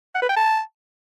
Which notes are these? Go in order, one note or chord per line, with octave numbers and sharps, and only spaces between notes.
F#5
B4
G5
A5